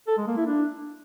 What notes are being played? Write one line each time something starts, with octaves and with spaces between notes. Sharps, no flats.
A4
G#3
A#3
E4
D4